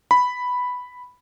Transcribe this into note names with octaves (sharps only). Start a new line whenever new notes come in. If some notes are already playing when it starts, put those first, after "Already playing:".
B5